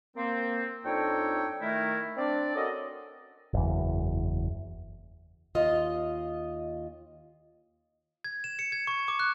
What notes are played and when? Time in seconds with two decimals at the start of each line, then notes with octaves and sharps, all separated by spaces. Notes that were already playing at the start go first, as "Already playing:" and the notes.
0.17 A#3 C4
0.85 F2 D4 D#4 A4 C#5 G5
1.62 D#3 A3 E4 A#4
2.17 C4 D4 D5
2.56 C#4 F#4 A4 A#4 D5 D#5
3.53 F#1 E2
5.55 D#2 F4 D#5
8.24 G#6
8.44 E7
8.59 C#7
8.72 G#6
8.87 C#6
9.08 D6
9.20 F#6